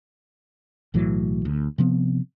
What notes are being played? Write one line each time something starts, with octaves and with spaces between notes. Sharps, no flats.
B1 A2 E3 F#3
D2
C3 F3 B3 C4